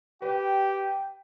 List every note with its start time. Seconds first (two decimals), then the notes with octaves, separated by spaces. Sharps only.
0.22 G4 B4 G5